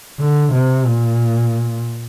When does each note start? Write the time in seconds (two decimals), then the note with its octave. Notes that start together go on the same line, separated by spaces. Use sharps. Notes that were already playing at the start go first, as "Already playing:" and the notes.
0.19 D3
0.53 C3
0.86 A#2